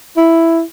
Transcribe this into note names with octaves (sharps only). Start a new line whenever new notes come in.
E4